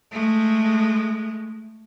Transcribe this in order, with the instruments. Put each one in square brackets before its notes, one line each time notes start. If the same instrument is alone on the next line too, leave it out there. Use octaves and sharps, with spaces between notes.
[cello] G#3 A3